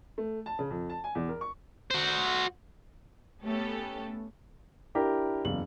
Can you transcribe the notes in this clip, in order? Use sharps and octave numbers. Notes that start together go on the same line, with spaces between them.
A3
A5
C#3
F2
A5
G#5
E2
A#4
C#6
F#4 C5
A3 B3 C#4 G4 A4
D4 E4 G4 A#4 A#5
F#1 E2 F#7